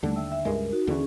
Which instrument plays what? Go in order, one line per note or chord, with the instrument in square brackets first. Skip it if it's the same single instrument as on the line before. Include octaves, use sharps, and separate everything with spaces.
[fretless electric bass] D#2 D3 [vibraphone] G3 A3
[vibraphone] E5 G5 E6
E5
[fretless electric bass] C#2 G2 G#3 [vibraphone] A#4
[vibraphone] D#4 F#4
[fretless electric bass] D#2 D3 E3 [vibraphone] C#4 G#4